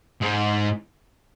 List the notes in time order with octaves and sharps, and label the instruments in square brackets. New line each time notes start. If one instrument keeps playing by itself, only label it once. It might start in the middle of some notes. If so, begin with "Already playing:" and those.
[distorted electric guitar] G#2